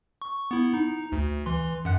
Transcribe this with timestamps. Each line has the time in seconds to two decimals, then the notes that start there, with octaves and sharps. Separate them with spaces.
0.22 C#6
0.51 B3 E4
0.74 D#4
1.12 D2
1.46 E3 C6
1.85 F#2 F#5 F#6